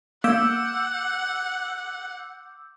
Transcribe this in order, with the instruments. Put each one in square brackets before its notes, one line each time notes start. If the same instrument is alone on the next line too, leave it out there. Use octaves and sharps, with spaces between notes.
[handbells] A#3 [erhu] F#5 [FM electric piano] D6 E6 G6